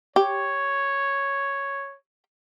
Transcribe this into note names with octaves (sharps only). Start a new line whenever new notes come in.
G4 C#5